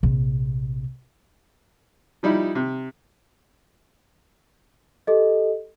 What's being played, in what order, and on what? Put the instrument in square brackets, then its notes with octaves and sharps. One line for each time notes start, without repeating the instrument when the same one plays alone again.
[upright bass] A#1 C3
[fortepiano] F3 G3 D#4 E4
C3
[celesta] G4 A4 D#5